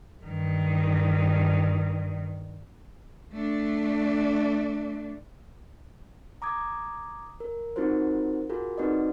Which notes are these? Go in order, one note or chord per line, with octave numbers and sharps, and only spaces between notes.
G2 D#3
A3 D4
A#5 D6 D#6 G#6
A#4
C4 D#4 F4 F#4 A#4 C5
F4 F#4 G#4 A#4
C4 D#4 F#4 B4 D5 D#5